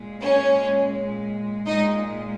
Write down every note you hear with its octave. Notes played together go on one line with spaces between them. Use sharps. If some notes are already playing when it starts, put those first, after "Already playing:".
Already playing: A#2 G#3
C#4 C#5
A#2 G#3 D#4 D#5